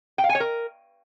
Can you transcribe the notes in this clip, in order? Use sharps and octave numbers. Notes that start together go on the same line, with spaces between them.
G5
F5
G#5
C#5
A#4